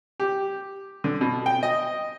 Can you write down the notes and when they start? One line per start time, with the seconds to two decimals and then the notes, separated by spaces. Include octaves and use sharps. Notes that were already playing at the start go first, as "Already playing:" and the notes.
0.20 G4
1.04 D3
1.21 B2
1.46 G5
1.63 D#5